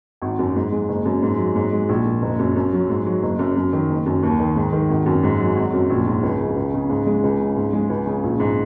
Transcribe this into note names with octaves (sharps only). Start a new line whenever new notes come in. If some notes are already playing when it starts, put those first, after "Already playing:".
G#1
F#2
G#2
G#3
F#1
F#2
G#2
F#3
G#2
G#3
A#1
A#2
F#1
F#2
F#2
F#3
G#2
F#3
F#1
F#2
F#2
D#3
F#1
F#2
D#2
D#3
G#2
D#3
G#1
F#2
G#2
F#3
G#1
F#2
A#1
G#2
C#2
C#3
C#2
C#3
G#2
G#3
C#2
C#3
G#2
G#3
C#2
C#3
A#1
G#2